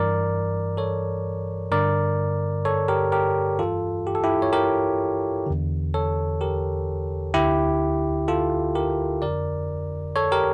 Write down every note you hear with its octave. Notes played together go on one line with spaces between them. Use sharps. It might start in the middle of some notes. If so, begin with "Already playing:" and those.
Already playing: G2 E3 A#4 D5
A4 C#5
G2 D3 A#4 D5
A4 C#5
G4 A#4
G4 A#4
G2 E3 F4 A4
G4
A4
E4 G4
C#5
G4 A#4
E2 D3
A4 C#5
G4 A#4
D2 D3 E4 G4
F4 A4
G4 A#4
F2 D3 A#4 D5
A4 C#5
G4 A#4